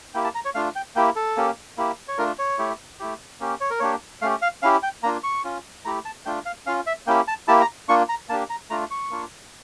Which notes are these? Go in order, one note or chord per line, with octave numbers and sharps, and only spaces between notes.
A#3 E4 G4 G5
A5
A#5
C#5
A3 D4 F4 F5
G5
A#3 E4 G4 G5
A4
A#3 C#4 G4
A#3 E4 G4
C#5
A3 D4 F4 A#4
C#5
A3 E4 G4
A3 E4 G4
A#3 C#4 G4
C#5
A#4
A#3 D4 G4 C#5
A3 C#4 G4 F5
F5
C#4 E4 G4 F5
G5
A#3 D4 F4 A#5
C#6
C#4 F4
A3 E4 G4 A#5
A5
A3 D4 F4 G5
F5
C#4 F4 F5
E5
A#3 C#4 E4 G4 G5
A5
A#3 E4 G4 A5
A#5
A#3 D4 F4 C#6
A#5
A#3 D4 G4 A5
A#5
A3 D4 F4 A#5
C#6
A#3 D4 F4